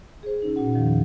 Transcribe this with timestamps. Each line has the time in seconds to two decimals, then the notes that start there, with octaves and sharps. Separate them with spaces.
0.23 G#4 C5
0.42 C3 C#4 D#4
0.56 A#2 C#4 F#4 F#5
0.75 E2 D#3 F3